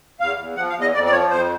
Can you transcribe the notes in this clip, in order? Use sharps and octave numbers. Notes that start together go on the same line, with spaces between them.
E2 F5
E2
F3 F#5
F5
E2
D#5
F2 D5
D5
F3 C#5
F2 C5